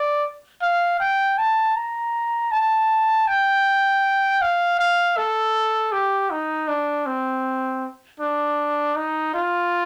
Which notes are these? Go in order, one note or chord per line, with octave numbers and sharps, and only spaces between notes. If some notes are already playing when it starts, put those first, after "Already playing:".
Already playing: D5
F5
G5
A5
A#5
A5
G5
F5
F5
A4
G4
D#4
D4
C4
D4
D#4
F4